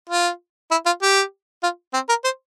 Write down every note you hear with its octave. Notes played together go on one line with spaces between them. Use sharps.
F4
E4
F4
G4
F4
C4
A#4
C5